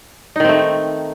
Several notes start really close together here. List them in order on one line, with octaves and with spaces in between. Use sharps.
D#4 D#3 C4 A3